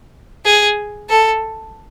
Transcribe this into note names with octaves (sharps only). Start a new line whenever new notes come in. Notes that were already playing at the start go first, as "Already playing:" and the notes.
G#4
A4